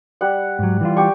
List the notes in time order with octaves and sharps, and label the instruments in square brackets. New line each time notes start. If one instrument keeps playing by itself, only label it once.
[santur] G3 F#5
[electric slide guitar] G#2 F#3
E3 G3 F4
[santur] G4 C#6